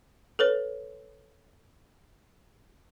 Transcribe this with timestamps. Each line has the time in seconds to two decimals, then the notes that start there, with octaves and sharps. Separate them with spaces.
0.39 A4 B4 C#5